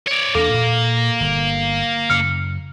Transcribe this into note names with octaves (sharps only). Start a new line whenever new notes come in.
C#5 D5
E2 A#3 B3 D4 A4
A#2
G1
F#2 C#3 F6 C#7 F7